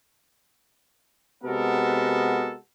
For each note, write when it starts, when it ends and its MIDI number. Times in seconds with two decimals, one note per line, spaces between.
1.43 2.54 48
1.43 2.54 56
1.43 2.54 59
1.43 2.54 66
1.43 2.54 69
1.43 2.54 70